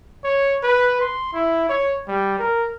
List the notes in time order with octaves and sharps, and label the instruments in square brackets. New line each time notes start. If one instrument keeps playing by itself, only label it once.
[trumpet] C#5
B4
C6
E4
C#5
G3
A#4